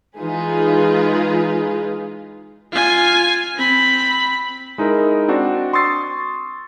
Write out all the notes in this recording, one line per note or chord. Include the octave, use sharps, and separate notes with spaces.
E3 G#3 D#4 F4 G#4 B4
F4 G#5
C4 B5
G#3 D#4 E4 A#4
C4 D4 F#4
C6 C#6 D#6 E6 A6 C7